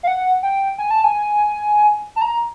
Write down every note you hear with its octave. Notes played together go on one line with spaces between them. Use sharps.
F5
F#5
G5
G#5
A5
G#5
A5
A#5